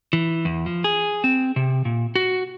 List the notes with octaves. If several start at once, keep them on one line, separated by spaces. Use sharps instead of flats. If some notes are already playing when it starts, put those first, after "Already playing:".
E3
E2
F3
G#4
C4
C3
A#2
F#4